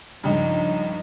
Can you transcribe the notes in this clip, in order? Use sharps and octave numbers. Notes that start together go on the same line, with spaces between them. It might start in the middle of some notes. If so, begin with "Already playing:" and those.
C#2 G2 F3 D#4